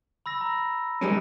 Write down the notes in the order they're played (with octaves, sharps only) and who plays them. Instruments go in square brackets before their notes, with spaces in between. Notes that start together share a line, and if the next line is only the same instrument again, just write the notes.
[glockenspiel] B5 E6 A#6
A#5
[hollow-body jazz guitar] G3 G#3 C#4 [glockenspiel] A#6 D7